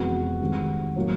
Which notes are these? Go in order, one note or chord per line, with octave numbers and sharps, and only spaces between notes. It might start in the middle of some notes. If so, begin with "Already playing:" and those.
Already playing: F2 C3 E3 G#3 B3 F#4
G#2 D#3 G3 C4
A2 F#3 A#3